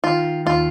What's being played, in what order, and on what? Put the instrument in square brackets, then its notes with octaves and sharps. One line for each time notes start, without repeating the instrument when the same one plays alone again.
[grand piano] D#3 [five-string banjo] F4
[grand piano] D#2 [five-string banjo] F4